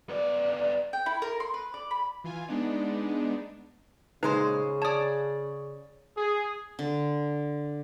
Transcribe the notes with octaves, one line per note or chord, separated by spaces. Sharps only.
B3 D5
G5
E4
A#4
C6
B4
D5
B5
E3 F4 G#5
G#3 B3 D4 D#4
A#2 C#3 G#3 D#4 B4 C5
C#5 D5 A5 D#6
G#4
D3